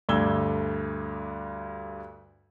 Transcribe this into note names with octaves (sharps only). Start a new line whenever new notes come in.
D2 G2 A3 E6 G#6 G7